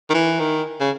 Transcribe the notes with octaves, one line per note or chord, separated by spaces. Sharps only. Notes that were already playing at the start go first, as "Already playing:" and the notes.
D#3
E3
D#3
C#3